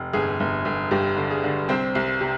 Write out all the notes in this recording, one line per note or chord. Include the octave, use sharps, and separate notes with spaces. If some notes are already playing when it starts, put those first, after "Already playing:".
Already playing: F1
G1 G#4
G1
G1
G2 G4
D3
G#4
D3
C2 C4 C5
C2
C3